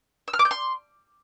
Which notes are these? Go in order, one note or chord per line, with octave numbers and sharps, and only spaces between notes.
E6
F6
D6
G6
C6